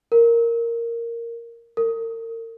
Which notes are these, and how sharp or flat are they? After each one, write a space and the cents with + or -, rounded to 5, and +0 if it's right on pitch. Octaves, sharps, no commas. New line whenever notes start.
A#4 -5
A#4 -40